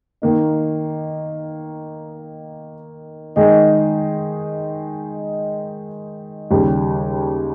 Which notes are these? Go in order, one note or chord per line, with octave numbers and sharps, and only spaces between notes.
D#3 A#3 D#4
D#3 G#3 D#4 G#4
D#2 C#3 G3